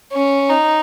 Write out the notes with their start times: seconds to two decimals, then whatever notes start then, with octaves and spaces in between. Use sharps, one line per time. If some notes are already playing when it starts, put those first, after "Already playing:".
0.13 C#4
0.49 D#4